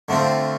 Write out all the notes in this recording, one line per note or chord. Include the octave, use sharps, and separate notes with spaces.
D3 A3 C4 F4